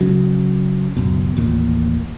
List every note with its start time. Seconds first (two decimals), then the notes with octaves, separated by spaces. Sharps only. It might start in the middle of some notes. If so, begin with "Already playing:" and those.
0.01 C#3 F#3
0.97 C#2 F#2 B2
1.37 A1 D#2 A#2